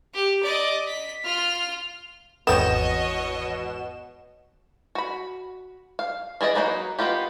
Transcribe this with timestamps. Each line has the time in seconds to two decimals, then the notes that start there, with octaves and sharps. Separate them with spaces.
0.14 G4
0.43 D5 D#5
0.88 B6
1.24 F4 F6
2.47 G#1 E2 B2 B3 C4 C#5 D#5 E7
4.95 F#4 B5
5.99 F5
6.41 E3 G#4 D5 D#5
6.55 F#3 A3 A#3 D#4 B4
6.99 A#3 B3 D#4 F4 G4